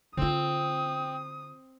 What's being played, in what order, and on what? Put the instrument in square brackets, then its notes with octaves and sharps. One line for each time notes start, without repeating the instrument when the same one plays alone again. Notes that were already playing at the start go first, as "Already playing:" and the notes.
[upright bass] D3 F4 [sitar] C4 [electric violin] D#6